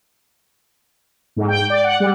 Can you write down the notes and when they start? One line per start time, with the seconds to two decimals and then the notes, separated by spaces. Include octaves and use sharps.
1.36 G#2
1.48 G5
1.70 D5
1.84 F#5
2.00 G3